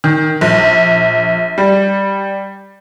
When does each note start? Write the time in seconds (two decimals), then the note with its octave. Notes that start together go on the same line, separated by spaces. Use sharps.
0.04 D#3
0.41 A#1
1.58 G3